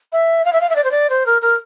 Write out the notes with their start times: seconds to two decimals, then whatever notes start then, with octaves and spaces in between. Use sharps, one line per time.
0.13 E5
0.45 F5
0.53 E5
0.61 F5
0.70 E5
0.76 D5
0.84 C5
0.91 D5
1.10 C5
1.26 A#4
1.42 A#4